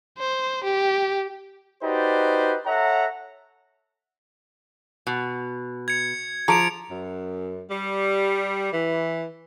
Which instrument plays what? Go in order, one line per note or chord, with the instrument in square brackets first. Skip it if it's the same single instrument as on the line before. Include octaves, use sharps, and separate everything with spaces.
[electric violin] C5
G4
[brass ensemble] D#4 F#4 G4 B4 C5 D5
A4 C#5 E5 F#5 A#5
[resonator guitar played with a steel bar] B2
[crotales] G#6 C#7
[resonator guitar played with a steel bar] F3 [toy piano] G#4 A5 A#5 [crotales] C#7 D7 F7
[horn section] F#2
G3
E3